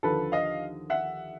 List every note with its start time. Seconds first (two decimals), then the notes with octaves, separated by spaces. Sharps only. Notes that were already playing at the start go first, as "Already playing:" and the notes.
0.03 D#2 D3 F3 A4 B4
0.32 D#5 F5
0.90 E5 F#5